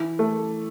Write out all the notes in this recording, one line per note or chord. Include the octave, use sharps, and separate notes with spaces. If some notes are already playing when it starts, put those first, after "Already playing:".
Already playing: E3 E4
A3